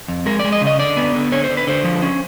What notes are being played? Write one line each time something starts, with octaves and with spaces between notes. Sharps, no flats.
F2
G#3 A#4
D5
G#3
D#5
C#3
D#5
D3 D5
B3
D3
D3 C#5
C5
D3
B4
D3 C5
F3
C#4